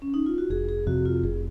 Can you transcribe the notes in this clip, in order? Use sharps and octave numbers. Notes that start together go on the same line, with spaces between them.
C#4
D#4
F4
F#4
F1 G#4
G#4
F2 C3 F#4
F4
F1 G#4